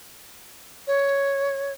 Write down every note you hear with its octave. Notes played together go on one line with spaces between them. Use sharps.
C#5